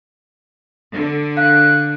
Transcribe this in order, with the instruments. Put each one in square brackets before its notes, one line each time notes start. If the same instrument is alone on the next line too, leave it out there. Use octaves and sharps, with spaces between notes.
[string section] D3
[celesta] F5 [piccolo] F#6